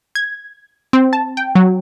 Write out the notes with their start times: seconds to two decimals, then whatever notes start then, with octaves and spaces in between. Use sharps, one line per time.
0.15 G#6
0.93 C4
1.13 A5
1.37 G5
1.55 F#3